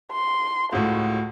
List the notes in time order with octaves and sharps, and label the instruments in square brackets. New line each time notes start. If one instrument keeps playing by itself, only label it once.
[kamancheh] C6
[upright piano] C#2 A2 [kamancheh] F#4